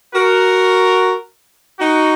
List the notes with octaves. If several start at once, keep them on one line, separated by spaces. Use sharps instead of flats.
F#4 A#4
D#4 F#4